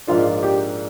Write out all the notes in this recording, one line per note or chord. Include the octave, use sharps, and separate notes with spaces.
A#1 G#2 F3 A#3 D4 F4
G4